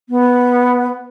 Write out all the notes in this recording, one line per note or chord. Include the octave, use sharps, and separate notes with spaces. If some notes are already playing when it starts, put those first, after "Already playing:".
B3